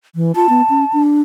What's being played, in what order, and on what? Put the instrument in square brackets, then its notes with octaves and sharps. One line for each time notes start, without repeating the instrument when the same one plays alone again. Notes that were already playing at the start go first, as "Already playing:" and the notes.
[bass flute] E3
[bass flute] F4 [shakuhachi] A5
[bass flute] B3
C#4
D4